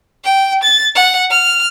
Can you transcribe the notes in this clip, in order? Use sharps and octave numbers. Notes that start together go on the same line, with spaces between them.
G5
A6
F#5
F6